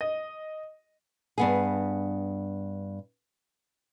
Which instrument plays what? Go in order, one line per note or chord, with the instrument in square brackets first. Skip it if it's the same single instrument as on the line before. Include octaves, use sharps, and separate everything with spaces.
[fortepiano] D#5
[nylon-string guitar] G2 B3 G#4